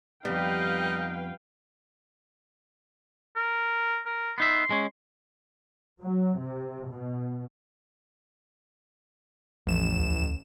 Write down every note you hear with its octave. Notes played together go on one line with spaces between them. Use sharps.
F2 G3 B3 D#4 B4 F5 G5
A#4
A#4
B3 D#4 E5 C6
G#3 C#4
F#3
C3
B2
A1 E2 F3 E7
D2